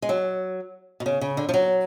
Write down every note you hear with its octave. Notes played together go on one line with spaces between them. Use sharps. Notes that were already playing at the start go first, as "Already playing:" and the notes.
G#3
F#3
B2
C#3
C#3
D3
F3
F#3